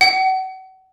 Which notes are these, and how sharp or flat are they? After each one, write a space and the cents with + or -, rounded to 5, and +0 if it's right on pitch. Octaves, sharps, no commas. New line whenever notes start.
F#5 +35